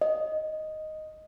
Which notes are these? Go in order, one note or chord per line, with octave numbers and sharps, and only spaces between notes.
D#5